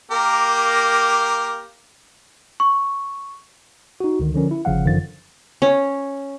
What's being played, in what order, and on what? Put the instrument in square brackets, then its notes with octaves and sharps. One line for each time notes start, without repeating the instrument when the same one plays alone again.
[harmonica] A#3 G4 A#4
[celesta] C#6
[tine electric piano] D#4 F#4
C#2 D3 D#3
D3 F3 C#4 A#4
E4
G1 C#3 F3 F5 F#5
F#2 D3 D#3 F3 A6
[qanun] C#4